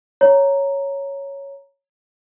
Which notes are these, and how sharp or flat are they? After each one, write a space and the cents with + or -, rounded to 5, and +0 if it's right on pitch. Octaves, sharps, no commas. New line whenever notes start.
C#5 +0 A#5 +0